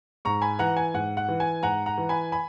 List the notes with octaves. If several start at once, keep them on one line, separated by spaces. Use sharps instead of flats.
G#2 A#5 C#6
G#5 B5
E3 F#5 A#5
G#5
G#2 F#5
F#5
E3
G#5
G#2 F#5 A#5
F#5 A#5
E3
G#5 B5
G#5 B5